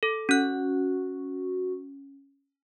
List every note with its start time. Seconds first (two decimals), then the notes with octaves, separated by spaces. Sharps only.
0.03 A4 D6
0.29 C#4 F#4 F#6